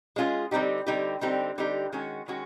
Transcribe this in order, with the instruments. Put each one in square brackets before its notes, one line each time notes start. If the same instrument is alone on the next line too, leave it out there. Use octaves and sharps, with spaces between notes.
[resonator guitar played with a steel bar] G#3 C#4 F4 G#4
D3 G3 C4 D#4 G4
D3 G3 C4 D#4 G4
D3 G3 C4 D#4 G4
D3 G3 C4 D#4 G4
D#3 G#3 C#4 F#4
D#3 G#3 C#4 F#4